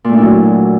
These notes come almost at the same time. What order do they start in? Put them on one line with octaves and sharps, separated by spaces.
A#2 A3 D4 E4 F#3